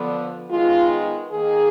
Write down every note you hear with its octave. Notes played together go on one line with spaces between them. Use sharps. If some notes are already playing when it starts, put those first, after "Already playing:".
Already playing: D3 F3 B3
D#3 G#3 B3 F4
D#3 A#3 G#4